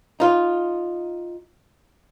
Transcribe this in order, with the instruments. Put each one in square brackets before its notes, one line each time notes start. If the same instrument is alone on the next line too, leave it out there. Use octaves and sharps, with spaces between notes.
[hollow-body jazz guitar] D#4 F4